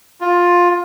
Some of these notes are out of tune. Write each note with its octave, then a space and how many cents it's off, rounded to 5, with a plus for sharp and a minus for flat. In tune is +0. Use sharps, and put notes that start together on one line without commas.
F4 +15